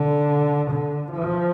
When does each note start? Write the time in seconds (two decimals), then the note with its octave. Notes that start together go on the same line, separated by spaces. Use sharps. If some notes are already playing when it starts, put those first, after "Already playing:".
Already playing: D3
0.71 D3
1.12 F3